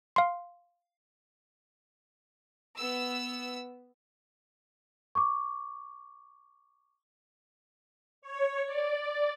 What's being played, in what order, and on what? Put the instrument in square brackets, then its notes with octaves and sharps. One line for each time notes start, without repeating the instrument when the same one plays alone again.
[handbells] F5 C6
[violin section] B3 E6
[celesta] C#6 D6
[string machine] C#5
D5